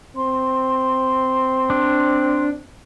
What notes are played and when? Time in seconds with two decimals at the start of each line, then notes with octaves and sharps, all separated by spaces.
0.17 C4 C6
1.70 D4